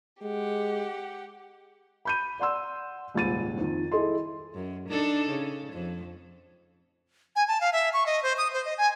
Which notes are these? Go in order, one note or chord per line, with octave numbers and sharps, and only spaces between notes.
G#3 G4 F#5
B5 G6 D#7
D5 F#5 C6 E6
D#1 C#2 G#2 A6 D#7
F2 D#3
E4 G#4 A4 D#5 C6
F#2
D4 D#4 A4
C#3
F2
G#5
A5
F5
E5
C#6
D#5
C5
D#6
C5
D#5
G#5